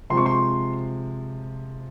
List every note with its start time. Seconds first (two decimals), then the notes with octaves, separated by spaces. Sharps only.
0.10 C3 F3 G#3 C6
0.17 C#6
0.26 C6